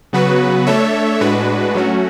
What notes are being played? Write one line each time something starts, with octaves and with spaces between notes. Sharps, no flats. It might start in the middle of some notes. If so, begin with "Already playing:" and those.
C#3 F#3 B3 F#4 B4
A3 D4 A4 C#5 E5
A2 G#3 D4 F#4 B4
F#3 A3 C#4 F#4